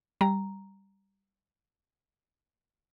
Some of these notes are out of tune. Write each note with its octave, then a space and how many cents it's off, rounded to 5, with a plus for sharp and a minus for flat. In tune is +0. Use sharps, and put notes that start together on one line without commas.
G3 +0 A#5 +0